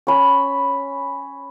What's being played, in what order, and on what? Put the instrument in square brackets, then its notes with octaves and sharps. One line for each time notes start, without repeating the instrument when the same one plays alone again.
[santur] C#4 B5